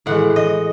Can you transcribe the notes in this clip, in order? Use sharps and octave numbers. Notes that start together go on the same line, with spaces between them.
A2 E3 G#3 F#5
D#5